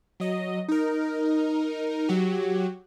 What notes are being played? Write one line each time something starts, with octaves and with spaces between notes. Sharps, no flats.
F#3 D#5
D#4 A#4
F#3 F#4 G4